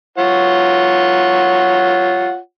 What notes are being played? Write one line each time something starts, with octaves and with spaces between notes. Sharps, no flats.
F4 C#5 F#5